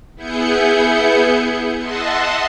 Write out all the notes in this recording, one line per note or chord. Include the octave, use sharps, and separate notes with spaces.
B3 E4 G#4 G6 C#7
D#5 E5 F#5 A5 C6